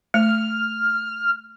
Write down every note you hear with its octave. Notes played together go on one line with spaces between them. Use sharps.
A3 F6